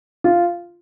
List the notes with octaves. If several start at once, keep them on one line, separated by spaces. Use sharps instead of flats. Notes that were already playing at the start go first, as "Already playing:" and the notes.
F4